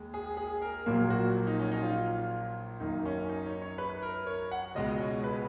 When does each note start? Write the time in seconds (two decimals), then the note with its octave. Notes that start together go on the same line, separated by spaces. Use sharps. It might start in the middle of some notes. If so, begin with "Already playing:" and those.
Already playing: D#2 G#3
0.14 G#4
0.37 G#4
0.62 A#4
0.86 A#1 A#2 F#3 A#3
1.10 F#4
1.47 D#4
1.59 C#4
1.72 D#4
1.83 F4
2.80 F#2 D#3 A#3 D#4
3.05 C#4
3.29 D#4
3.46 C#5
3.62 C#5
3.78 B4
4.02 A#4
4.27 C#5
4.51 F#5
4.75 C#2 B2 G#3 D#5
5.00 C#5
5.24 B4